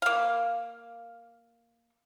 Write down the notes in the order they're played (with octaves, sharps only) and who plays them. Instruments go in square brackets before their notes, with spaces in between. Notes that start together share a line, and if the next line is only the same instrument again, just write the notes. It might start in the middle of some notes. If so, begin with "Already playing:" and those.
[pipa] A#3 F5